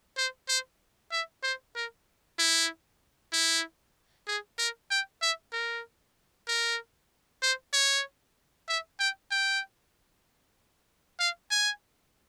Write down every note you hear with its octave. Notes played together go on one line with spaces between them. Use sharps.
C5
C5
E5
C5
A#4
E4
E4
G#4
A#4
G5
E5
A#4
A#4
C5
C#5
E5
G5
G5
F5
G#5